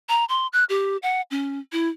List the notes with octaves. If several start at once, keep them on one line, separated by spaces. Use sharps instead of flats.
A#5
C6
F#6
G4
F#5
C#4
E4